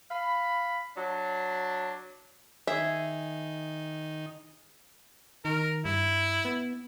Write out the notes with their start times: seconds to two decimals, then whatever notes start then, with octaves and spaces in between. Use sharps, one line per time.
0.11 F5 B5
0.96 F#3 D4
2.67 D#3 D#4 G#4 E5
5.45 D#3 A#4
5.85 G2 E4
6.45 B3